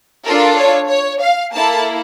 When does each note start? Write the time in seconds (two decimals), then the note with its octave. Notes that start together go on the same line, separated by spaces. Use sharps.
0.25 D4 F4 A4 A#4
0.57 C#5
0.89 C#5
1.22 F5
1.54 A#3 E4 A4 A5